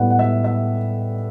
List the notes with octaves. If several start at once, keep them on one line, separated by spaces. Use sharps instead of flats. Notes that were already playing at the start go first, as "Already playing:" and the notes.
Already playing: A2 G3 B3 F#5 G5
F#5
E5
E5